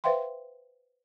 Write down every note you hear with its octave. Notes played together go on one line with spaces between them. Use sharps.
B4 C5 E5 F5 G5 C6